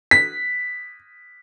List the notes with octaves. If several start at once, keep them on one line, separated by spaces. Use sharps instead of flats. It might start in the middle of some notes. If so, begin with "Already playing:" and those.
B6